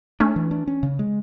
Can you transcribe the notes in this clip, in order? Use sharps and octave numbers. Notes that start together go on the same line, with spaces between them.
A3 C#4 D4
E3
D4
C#4
C#3
G#3